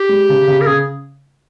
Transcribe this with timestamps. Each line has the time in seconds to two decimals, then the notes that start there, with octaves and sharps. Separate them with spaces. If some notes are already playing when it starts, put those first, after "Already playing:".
Already playing: G4
0.09 G#3
0.29 C#3
0.47 C#3
0.61 A#4
0.67 C#3 G#4